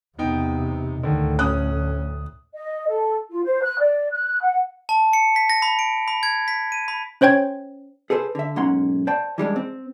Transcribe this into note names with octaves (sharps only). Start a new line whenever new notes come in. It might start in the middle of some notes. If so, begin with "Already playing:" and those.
E2 C3 B3 D#4 G5
D2 A2 D3 D#3
C#4 D#6 F#6
D#5
A4
F4
C5
F#6
D5
F#6
F#5
A5
C#7
B6
A#6
B5
D7
B5
G#6
B6
D#7
B5
C#4 C5 C#5 G5 G#6
G#4 A4 B4 C5
D3 E5
B1 G#2 A#3 C#4 F#5 C6
C5 D5 G5 A5
E3 G3 G#3 D4
C4